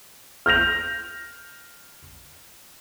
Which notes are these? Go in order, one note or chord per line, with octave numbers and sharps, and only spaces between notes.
F6 G6 A#6 F7